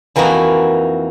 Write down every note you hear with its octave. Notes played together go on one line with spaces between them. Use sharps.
F2 E3 A#3 D#4 F#4